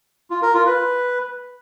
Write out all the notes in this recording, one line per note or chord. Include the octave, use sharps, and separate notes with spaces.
F4
A#4
F4
B4